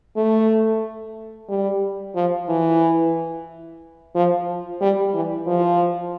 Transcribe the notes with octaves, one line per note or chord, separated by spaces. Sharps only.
A3
G3
F3
E3
F3
G3
E3
F3